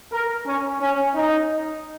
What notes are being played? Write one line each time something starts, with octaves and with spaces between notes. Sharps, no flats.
A#4
C#4
C#4
D#4